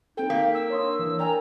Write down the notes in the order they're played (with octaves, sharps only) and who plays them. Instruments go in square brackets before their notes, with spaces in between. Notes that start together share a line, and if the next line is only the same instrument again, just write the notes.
[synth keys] C4 A4 [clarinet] D#4 [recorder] G5
[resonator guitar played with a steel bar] A#3 [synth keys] B6
[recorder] E6
[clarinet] D4 [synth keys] C#5 C6 D#6
[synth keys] E3
[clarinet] A#4 [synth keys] D5 G5 G#5 [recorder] A#5